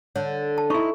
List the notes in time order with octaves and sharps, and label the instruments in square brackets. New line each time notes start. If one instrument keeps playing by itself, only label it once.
[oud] D3 [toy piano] C#5
[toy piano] A5
[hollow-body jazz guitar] D#4 E4 [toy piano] C6 C#6